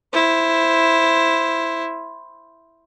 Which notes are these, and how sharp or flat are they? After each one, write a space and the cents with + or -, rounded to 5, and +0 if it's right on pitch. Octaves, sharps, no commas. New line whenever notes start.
E4 +5 C5 +5